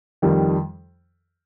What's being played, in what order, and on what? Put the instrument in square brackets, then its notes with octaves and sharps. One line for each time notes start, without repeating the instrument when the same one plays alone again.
[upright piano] F2 D#3 G3